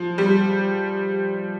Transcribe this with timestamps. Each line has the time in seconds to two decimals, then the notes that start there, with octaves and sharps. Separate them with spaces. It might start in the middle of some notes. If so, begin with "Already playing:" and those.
Already playing: F3
0.18 G3